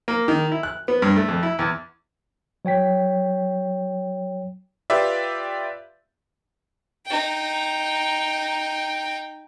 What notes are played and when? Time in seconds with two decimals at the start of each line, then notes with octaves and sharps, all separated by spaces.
0.08 A#3
0.28 D#3
0.52 E4
0.63 F#6
0.88 B3
1.02 G2
1.16 A3
1.28 F2
1.43 E4
1.59 E2
2.65 F#3 C#5 G5 B6
4.90 F4 G4 B4 D5 E5
7.06 D#4 G5